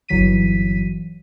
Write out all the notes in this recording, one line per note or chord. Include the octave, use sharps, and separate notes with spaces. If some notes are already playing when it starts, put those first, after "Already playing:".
G1 E3 F#3 B6 D#7